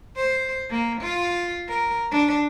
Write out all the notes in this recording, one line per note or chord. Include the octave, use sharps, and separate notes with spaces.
C5
A#3
F4
A#4
D4